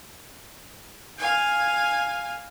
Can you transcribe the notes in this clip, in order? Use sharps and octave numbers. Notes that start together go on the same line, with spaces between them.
F5 G#5